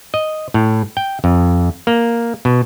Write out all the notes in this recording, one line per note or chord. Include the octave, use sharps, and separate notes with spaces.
D#5
A2
G5
F2
A#3
B2